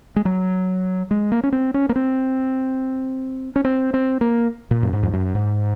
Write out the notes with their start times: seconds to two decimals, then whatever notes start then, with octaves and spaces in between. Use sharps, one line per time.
0.16 G#3
0.25 F#3
1.11 G#3
1.32 A#3
1.43 C#4
1.52 C4
1.74 C#4
1.89 A#3
1.96 C4
3.56 C#4
3.65 C4
3.94 C4
4.21 A#3
4.71 A#2
4.83 F#2
4.93 G#2
5.03 F2
5.13 F#2
5.35 G#2